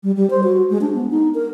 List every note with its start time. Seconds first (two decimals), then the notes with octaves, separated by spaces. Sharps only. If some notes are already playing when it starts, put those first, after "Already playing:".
0.03 G3
0.17 G3
0.30 C5
0.43 F#4
0.70 G#3
0.81 D4
0.94 B3
1.11 D#4
1.35 A#4